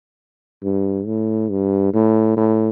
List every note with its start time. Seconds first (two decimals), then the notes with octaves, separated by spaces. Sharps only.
0.64 G2
1.06 A2
1.51 G2
1.94 A2
2.37 A2